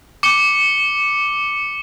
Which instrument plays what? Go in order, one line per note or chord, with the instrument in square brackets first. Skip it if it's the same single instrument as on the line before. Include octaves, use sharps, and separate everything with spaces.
[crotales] D6 C#7 G7